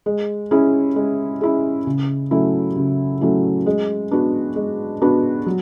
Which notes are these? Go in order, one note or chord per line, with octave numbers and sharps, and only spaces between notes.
G#3
C#4 E4 G#4
G#3
C#4 E4 G#4
C#3
F#3 A3 C#4 E4
C#3
F#3 A3 C#4 E4
G#3
B3 D4 F#4
G#3
B3 D4 F#4
F#3